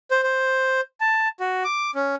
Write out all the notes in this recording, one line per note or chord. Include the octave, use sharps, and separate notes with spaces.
C5
C5
A5
F#4
D6
C#4